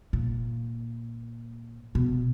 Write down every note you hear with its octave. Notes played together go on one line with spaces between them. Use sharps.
A#2
B2